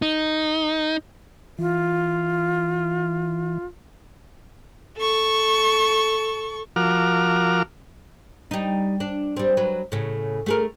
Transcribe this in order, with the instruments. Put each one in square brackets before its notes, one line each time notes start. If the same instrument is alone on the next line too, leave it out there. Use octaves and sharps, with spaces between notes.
[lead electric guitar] D#4
[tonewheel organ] E3 [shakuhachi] F4
[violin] A4 C#6
[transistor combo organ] F3 F#4 A#4 D6 F6
[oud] G3 D#4
D4
G3 C4
F#3 B4
A2 C#3
A3 G#4 A#4